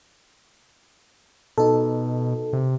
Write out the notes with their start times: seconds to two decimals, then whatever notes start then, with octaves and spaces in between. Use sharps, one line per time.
1.58 B2 D#4 A4
2.53 C3